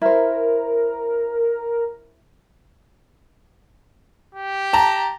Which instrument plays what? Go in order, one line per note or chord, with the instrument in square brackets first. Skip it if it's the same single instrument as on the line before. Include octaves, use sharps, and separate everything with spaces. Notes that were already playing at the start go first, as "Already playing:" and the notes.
[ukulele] E4 C5 [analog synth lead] A#4
[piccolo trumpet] G4
[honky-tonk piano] A5 A#5